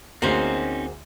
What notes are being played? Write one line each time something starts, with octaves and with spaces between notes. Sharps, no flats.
D2 A#3 C4 C#4 D#4 F#4 G#4 C5